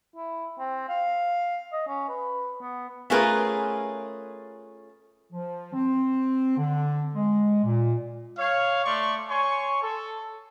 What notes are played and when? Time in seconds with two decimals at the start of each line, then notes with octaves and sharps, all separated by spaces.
0.16 E4
0.59 C4
0.89 F5
1.73 D#5
1.87 C#4
2.09 B4
2.61 B3
3.10 A3 C#4 F4 G#4 A#4 B4
5.32 F3
5.73 C4
6.57 D3
7.14 G#3
7.64 A#2
8.38 C#5 F5
8.84 A3 D5 C6 C#6
9.29 C#5 G#5 C6 C#6
9.82 A4